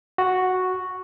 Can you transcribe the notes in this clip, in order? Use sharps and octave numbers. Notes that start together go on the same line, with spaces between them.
F#4